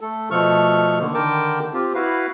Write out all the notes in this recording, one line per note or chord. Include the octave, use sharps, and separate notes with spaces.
A3 A4
B2 F3 A3 A4 C#6 F6
D3 D#3 A#3
D3 D#3 A#4 G5 A5 D6
C4 F4 G4
E4 F#4 B4 F5